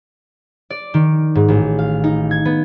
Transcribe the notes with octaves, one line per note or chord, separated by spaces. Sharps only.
D5
D#3
G#2
A1
F5
D#4
G#6
B3